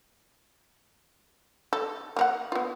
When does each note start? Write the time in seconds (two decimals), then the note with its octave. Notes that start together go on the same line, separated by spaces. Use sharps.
1.73 A4
2.17 A#3 A#4 F#5
2.52 B3 F4